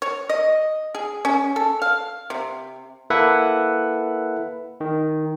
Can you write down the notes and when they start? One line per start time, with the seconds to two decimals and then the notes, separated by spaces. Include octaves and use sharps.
0.02 C#5
0.29 D#5
0.95 G#4
1.25 C#4
1.56 A4
1.82 F5
2.30 C3
3.10 A#3 E4 A4 B4 E5 F#5
4.81 D#3